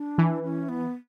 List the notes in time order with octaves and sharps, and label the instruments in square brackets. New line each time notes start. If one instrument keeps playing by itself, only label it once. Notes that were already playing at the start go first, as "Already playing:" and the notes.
Already playing: [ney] D4
[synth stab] E3
[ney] C#4
B3